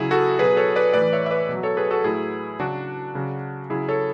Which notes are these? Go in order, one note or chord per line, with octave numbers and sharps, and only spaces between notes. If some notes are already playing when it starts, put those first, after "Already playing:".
Already playing: C#3 F#3 E4 G#4
F#4 A4
B2 F#3 G#4 B4
A4 C#5
B4 D5
A2 E3 B4 D5
C#5 E5
E5
B4 D5
B2
F#3
A4 C#5
G#4 B4
F#4 A4
A2 F#3 E4 G#4
C#3 F#3 D4 F#4
C#3 F#3
C#3 F#3 E4 G#4
A4 C#5